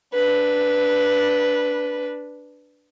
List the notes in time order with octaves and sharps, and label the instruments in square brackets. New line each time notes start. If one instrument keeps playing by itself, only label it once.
[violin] D4 B4